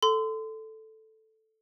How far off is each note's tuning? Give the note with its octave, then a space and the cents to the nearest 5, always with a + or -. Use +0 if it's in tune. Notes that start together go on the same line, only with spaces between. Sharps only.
A4 +0 C6 -30